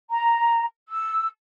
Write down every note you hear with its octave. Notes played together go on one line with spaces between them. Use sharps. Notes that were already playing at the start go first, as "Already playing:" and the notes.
A#5
E6